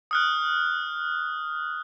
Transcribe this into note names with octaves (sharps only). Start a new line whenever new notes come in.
D#6 F6 F#6